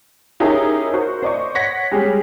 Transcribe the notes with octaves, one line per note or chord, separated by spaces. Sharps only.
C#4 D#4 E4 G4 G#4 A#4
F#4 A#4 C5 C#6
C5 D5 D#5 C#6
C#5 F#5 G#6 A#6 B6 C#7
G3 G#3 C#4 G4 G#4